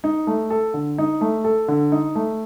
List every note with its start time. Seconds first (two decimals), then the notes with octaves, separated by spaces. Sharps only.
0.04 D#4
0.27 A3
0.50 A4
0.74 D3
0.98 D#4
1.21 A3
1.44 A4
1.68 D3
1.92 D#4
2.15 A3